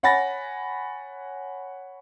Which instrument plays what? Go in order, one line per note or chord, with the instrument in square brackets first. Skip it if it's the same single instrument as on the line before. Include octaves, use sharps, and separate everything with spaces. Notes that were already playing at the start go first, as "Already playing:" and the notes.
[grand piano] C#5 F#5 G#5 B5 A6 A#6